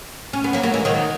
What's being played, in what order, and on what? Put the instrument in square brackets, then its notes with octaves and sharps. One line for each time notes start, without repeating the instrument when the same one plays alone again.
[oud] C#4
B3
F#3 A#3
F#3 A#3
E3 G#3
D#3 F#3